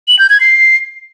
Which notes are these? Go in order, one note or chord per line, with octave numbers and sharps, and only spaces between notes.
F#7
G6
G#6
C7